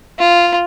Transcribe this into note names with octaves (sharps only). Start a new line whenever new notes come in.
F4